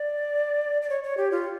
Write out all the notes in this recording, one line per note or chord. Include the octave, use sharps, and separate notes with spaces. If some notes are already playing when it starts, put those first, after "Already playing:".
Already playing: D5
D5
C#5
C#5
G4
F4